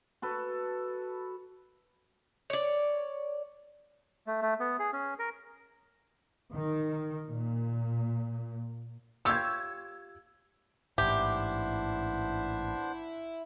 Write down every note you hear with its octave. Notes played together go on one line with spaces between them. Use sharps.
F#4 A4 B4
C#5 D5
A3
A3
B3
G#4
C#4
A#4
D#3
A#2
F4 G4 C#5 E6 G#6
A1 G#2 B3 D4 E4 G4 C5